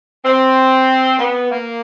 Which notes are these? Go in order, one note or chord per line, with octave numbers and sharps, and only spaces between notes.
C4
B3
A#3